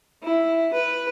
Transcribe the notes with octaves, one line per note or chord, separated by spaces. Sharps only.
E4
B4